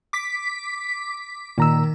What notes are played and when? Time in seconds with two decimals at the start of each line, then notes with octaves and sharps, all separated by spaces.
0.13 D6 B6
1.58 A#2 D#3 A#5 E6